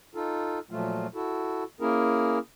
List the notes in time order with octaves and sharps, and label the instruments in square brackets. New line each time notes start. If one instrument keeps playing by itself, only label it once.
[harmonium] D#4 F4 A4
A#2 F3 F#3 A3 F4
E4 F#4 A4
A#3 C#4 E4 G#4 A#4